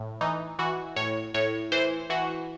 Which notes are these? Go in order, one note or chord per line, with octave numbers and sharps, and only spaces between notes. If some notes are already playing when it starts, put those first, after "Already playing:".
Already playing: A2
E3 D#4
E3 F#4
A2 C#5
A2 C#5
E3 C5
E3 F#4